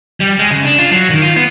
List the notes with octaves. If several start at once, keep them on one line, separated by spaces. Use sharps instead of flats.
G3
G#3
C#3
D4
F4
F#3
D#3
F4
B3